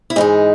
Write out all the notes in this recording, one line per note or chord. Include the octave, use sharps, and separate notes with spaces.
E4
G#2 E3 G#3 D#4